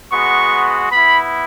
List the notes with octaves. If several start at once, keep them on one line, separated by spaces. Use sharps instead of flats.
G#3 B3 F#4 C#6
B3 E4 B5